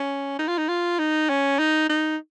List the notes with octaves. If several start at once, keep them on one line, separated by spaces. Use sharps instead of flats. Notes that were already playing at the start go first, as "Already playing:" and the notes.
Already playing: C#4
D#4
F4
D#4
F4
D#4
C#4
D#4
D#4